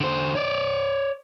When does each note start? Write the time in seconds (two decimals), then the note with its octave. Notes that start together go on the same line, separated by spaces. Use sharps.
0.01 D3 C5
0.35 C#5 D5